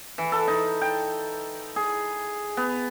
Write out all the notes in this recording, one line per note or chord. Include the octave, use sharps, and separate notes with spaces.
E3
A4
D#4
G5
G#4
B3